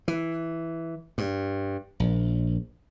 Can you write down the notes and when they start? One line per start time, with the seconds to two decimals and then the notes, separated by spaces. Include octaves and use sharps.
0.08 E3
1.18 G2
2.00 A#1